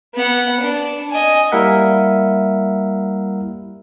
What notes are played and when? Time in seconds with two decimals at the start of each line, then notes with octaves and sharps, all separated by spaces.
0.15 B3 F#5
0.61 D4
1.11 D#5 G#5
1.52 G3 A#3 E4 A#4 E5 F#5